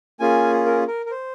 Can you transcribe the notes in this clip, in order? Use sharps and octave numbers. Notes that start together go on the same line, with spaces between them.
A#3 C#4 F4 G#4 G#5
A#4
A#4
A#4
C5